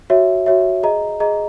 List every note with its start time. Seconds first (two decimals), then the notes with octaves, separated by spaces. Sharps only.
0.10 F#4 C#5 E5
0.46 F#4 C#5 E5
0.83 G#4 D#5 A#5
1.20 G#4 D#5 A#5